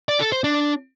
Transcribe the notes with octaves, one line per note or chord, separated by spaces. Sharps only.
D5
A4
C5
D4